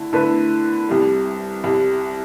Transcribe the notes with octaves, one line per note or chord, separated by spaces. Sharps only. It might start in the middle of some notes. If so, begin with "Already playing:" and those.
Already playing: D3 A3 E4
D3 A3 E4 B4
C2 C3 G3
C2 C3 G3